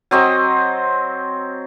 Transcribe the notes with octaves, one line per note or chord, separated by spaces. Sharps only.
F#3 C4 D#5